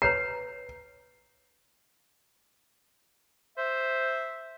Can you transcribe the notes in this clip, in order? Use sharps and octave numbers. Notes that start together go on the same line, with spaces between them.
B4 C#5 A#5 C7
C5 E5